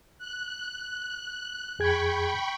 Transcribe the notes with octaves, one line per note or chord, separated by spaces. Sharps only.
F#6
F2 G#4 G5 B5 C#6 G#6